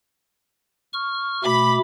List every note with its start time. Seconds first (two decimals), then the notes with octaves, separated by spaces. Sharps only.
0.93 C#6 F6
1.44 B2 A3 B5 D6